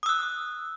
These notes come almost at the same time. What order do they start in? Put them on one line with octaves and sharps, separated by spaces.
D#6 E6 F#6